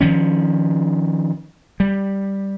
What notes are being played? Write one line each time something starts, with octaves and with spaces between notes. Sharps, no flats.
D#3 F3 C#4
G3